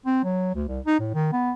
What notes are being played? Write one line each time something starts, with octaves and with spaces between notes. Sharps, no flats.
C4
F#3
D2
C2
D#4
A2
D#3
B3